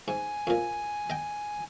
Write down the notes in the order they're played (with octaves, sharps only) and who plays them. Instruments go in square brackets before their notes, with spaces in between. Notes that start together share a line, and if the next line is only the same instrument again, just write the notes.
[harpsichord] G#2 [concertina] G#5
[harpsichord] F2 A#2
D#5 G5